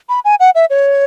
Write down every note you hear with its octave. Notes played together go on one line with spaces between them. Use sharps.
B5
G#5
F#5
E5
C#5